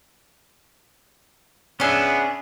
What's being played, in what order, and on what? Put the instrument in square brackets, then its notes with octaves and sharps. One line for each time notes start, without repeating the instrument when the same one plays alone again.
[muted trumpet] B3 [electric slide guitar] C#4 G#4 E5 [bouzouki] D4 G#5